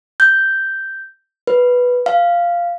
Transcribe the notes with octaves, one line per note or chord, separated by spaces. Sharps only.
G6
B4
F5